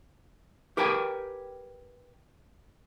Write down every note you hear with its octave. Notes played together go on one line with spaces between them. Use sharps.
G4 A#4 B4 G5 G#5